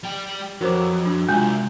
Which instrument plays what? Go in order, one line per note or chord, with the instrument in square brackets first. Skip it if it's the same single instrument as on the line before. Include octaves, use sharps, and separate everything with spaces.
[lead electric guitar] G3 G5
[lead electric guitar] F2 [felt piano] F#3 [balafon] A#4 C5 D6
[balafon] D4 F#4
[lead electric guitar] C2 [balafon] G#3 F4 [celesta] G5 G#5 G6